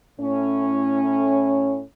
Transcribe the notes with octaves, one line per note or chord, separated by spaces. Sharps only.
A2 C#4